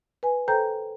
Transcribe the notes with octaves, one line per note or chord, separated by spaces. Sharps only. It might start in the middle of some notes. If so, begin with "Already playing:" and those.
B4 G#5
A4 C5 G5 A#5 G6